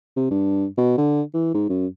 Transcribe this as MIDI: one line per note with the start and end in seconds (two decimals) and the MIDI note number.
0.16 0.28 48
0.31 0.66 43
0.78 0.97 47
0.98 1.22 50
1.34 1.50 52
1.54 1.65 44
1.69 1.87 42